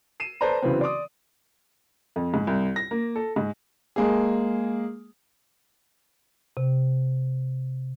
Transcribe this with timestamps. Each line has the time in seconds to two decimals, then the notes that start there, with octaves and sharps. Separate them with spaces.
0.20 C7 D#7 E7
0.41 A4 B4 C5 D5 A5 A#5
0.62 C#3 E3 F#3 B3 C4
0.81 D5 C6 D6 D#6
2.16 F2
2.34 G#2
2.47 C2
2.76 A#6
2.91 A#3
3.16 A4
3.36 G#2
3.96 G#3 A#3 G#4
6.57 C3